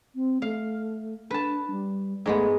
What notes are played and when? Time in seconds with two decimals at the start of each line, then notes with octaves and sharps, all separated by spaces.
0.15 C4
0.42 A3 F5
1.31 D4 B4 A5
1.71 G3
2.26 G#2 G#3 A3 B3